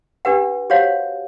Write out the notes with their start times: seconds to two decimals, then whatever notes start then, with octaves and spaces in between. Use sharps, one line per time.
0.25 D4 G4 B4 F#5
0.70 F#4 G4 C5 C#5 F5 F#5